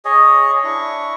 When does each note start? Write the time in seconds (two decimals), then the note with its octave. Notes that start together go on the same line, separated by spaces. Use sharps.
0.05 G#4 C#5 D#5
0.64 D4 E4 C#6